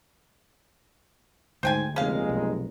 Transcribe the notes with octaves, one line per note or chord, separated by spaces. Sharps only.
D2 G#2 C5 G5 G#5
F1 F2 A#2 G#3 C#4 F5
B1